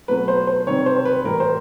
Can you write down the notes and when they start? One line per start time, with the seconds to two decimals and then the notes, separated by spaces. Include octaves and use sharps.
0.08 B2 F#3 A3 B4
0.28 C5
0.47 C5
0.67 C3 D#3 G3 C#5
0.86 C5
0.96 C5
1.05 B4
1.25 A2 E3 G3 A#4
1.40 C5